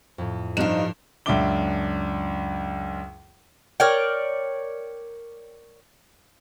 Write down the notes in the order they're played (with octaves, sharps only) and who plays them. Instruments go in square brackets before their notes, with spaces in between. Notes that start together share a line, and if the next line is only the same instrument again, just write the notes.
[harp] F2 A2
[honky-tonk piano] G2 E7 [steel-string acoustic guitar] F3 F5 [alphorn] D#4 [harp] F#6
[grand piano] C#2 F#2 D4 E5 D6 G7
[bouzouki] A#4 C#5 D5 G5